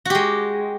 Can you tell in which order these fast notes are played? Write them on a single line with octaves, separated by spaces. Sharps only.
F#4 G4 G#3